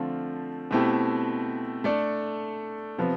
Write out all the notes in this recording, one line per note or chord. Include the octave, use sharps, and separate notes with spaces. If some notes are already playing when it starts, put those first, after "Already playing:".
Already playing: D3 F3 A3 C4 F4
B2 A3 C4 E4 G4
A3 D4 A4 D5
C3 F3 B3